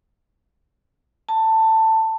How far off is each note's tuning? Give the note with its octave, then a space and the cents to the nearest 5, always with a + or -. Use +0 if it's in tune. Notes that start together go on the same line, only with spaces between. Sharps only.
A5 +15